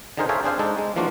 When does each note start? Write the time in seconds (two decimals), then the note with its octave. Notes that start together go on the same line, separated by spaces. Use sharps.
0.17 D3 D#3 D#4 G#4 A#4 C5
0.29 G#4 A4 C5 C#5 E5 F5
0.43 C4 D4 G#4 C5 F5
0.59 G#3 D4 D#4 A4
0.79 G#3
0.96 E3 F3 A#3 D4 F4 F#4